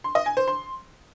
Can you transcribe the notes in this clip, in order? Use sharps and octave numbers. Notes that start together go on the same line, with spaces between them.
C6
D#5
G#5
C5
C6